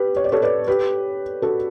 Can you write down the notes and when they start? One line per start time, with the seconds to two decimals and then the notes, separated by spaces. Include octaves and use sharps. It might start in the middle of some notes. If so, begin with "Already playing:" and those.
Already playing: G4 B4
0.16 C#5
0.24 D5
0.32 A4 C#5
0.42 B4 D5
0.67 G4 B4
1.42 F#4 A4